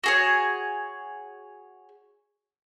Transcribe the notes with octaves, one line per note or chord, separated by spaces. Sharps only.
F#4 G#4 C#5